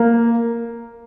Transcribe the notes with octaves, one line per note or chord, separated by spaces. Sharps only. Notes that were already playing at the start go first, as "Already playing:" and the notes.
Already playing: A#3